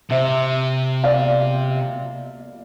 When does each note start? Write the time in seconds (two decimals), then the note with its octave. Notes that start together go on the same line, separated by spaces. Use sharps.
0.10 C3 C5 E5
1.04 D5 F5